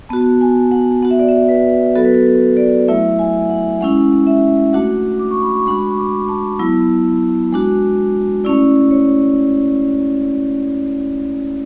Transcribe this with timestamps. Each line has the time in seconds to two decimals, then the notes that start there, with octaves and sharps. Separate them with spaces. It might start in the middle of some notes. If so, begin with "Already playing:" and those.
0.09 B3 F#4 A5
0.41 G#5
0.72 F#5
1.03 B3 F#4 F#5
1.11 E5
1.19 D5
1.29 E5
1.48 B4
1.95 F#3 B3 F#4 A4
2.05 B4
2.15 A4
2.27 B4
2.57 D5
2.88 F#3 A3 E4 E5
3.19 G#5
3.50 F#5
3.81 G#3 C#4 E4 F#5
4.27 E5
4.73 A3 D4 F#4 F#5
5.19 D6
5.31 C#6
5.42 B5
5.54 C#6
5.66 G#3 D4 F#4 B5
5.91 C#6
5.97 D6
6.29 A5
6.59 F#3 B3 E4
7.53 G#3 D4 F#4
8.44 A3 C#4 E4 D5
8.91 C#5